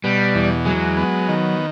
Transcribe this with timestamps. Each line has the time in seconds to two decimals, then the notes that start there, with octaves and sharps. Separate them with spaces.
0.04 B2 G3
0.35 E2
0.65 F#3 G#3
0.97 B3
1.29 D#3